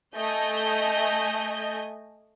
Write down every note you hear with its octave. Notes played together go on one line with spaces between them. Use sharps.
A3 D#5 G#5 G6